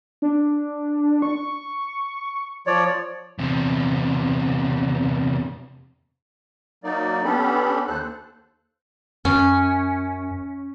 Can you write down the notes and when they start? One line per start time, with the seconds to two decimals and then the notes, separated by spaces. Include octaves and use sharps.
0.22 D4
1.22 C#6
2.67 F3 C#5 D5
3.38 E2 C3
6.84 F#3 A#3 D#4 D5
7.24 B3 C#4 D4 G4 A4 B5
7.88 D#2 A4 C5 F#6
9.25 F#2 C#4